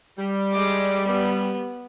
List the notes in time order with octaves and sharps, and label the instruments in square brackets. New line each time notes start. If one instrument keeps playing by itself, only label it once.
[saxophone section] G3
[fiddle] G#3 D6
B3